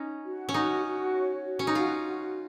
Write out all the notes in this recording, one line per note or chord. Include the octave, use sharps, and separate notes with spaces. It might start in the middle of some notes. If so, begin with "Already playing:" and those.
Already playing: C#4 D#4
F#4
C#4
D#4 F#4
F#4
C#5
F#4
C#4
D#4
F4 F#4
F#4